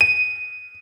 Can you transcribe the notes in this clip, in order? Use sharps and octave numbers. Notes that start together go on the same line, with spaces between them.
D#7